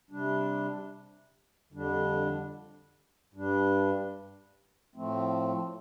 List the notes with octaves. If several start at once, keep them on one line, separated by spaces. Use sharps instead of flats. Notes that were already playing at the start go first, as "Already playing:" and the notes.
C3 G3 D4
F2 D3 G3 D4
G2 G3 D4
A2 F3 A3 C4